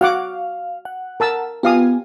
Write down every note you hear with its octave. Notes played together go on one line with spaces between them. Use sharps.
F#4 F5 F#5 D6
F#5
A#4 A5 E6
B3 F4 G4 F5 G#5 D#6